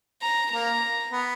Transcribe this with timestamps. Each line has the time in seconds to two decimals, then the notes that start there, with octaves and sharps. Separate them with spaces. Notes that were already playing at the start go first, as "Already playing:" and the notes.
0.22 A#5
0.52 A#3 A#5
1.11 B3